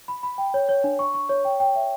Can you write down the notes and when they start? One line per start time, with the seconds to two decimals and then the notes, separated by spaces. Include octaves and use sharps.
0.08 B5
0.23 B5
0.38 G5
0.54 C#5
0.69 C#5
0.84 D4
0.99 C#6
1.14 C#6
1.29 C#5
1.45 G5
1.60 G5
1.75 E5